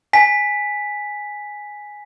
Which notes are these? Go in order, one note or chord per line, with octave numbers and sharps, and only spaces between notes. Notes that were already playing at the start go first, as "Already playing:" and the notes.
G#5 B6